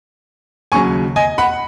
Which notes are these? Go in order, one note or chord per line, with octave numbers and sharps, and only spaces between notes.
D#2 C#3 F#3 G#5 C#6
D#5 G#5
F#5 B5